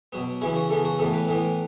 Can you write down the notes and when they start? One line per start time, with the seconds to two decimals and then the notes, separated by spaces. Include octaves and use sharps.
0.12 B2 F#3 B3
0.41 C#3 E3 B3 E4
0.56 F#4
0.70 C#3 E3 B3 A4
0.85 F#4
0.99 A2 E3 B3 A4
1.14 B4
1.28 A2 E3 B3